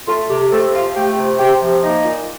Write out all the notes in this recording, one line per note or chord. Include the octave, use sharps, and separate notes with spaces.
A3 F4
C3 G4
C3 A3 A4
F3 F4 F5
A3 G4 G5
C3
C3 G4 G5
F3
A#3 D#4 D#5
A#2